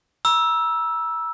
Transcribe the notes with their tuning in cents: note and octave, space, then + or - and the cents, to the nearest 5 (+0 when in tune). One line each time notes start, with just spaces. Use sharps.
A#5 +45 E6 +0